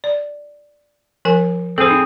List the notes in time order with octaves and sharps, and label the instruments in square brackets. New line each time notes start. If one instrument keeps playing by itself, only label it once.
[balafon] D5
F3 A#4 G#5
[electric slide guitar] C4 G#4 [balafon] A4 C5
[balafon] D#4